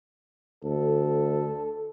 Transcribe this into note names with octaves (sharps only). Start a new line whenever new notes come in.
D2 A4